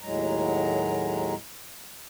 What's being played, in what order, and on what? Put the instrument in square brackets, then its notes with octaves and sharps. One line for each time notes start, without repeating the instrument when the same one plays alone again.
[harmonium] D#2 A2 F#3 G#3 A#5